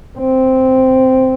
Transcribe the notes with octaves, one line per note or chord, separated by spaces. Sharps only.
C4